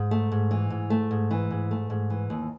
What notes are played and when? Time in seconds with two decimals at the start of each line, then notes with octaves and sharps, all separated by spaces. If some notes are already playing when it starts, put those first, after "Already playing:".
Already playing: G#2
0.11 A3
0.32 G#2
0.51 E3
0.70 G#2
0.90 A3
1.11 G#2
1.31 E3
1.51 G#2
1.71 A3
1.90 G#2
2.10 E3
2.30 D#2